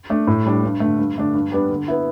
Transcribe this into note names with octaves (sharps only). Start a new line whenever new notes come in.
A3 D4
A2
G3 D4
G2
D3 A3
G2
D3 A3 D4
G2
G3 B3 D4
D3
B3 E4